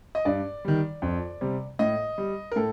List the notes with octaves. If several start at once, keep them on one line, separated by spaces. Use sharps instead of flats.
D#5
G2 D5
D#3 G3
F2
C3 G3
A2 D#5
G3
A#4
A2 A4